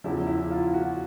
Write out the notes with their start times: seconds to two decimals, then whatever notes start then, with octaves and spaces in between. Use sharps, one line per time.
0.04 E2 C#3 F3 E4
0.26 E4
0.51 F4
0.74 F#4